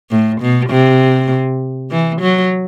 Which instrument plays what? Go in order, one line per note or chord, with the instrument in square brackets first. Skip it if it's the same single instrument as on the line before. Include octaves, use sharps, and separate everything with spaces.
[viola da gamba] A2
B2
C3
E3
F#3